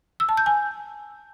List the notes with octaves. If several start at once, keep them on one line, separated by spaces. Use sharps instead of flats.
E6
A5
G6
G#5